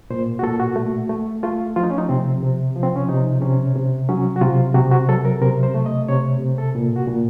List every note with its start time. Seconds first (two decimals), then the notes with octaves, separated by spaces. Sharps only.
0.10 A#2 C5
0.39 F#4
0.43 A#2 A4
0.60 F#4
0.76 A3
1.10 A3
1.43 A3 F4
1.76 F3 F4
1.83 D#4
1.90 C#4
1.98 D#4
2.09 C3 C4
2.43 C3
2.76 F3
2.83 C4
2.96 C#4
3.08 C3 D#4
3.42 C3 C#4
3.76 C3
4.09 F#3 C#4
4.36 F#4
4.41 C3 F4
4.74 C3 F#4
4.91 F#4
5.09 F#3 A4
5.25 A#4
5.41 C3 A#4
5.63 C5
5.74 A3
5.86 D#5
6.08 C3 C#5
6.41 C3
6.58 A4
6.75 A#2
6.96 F#4
7.08 A#2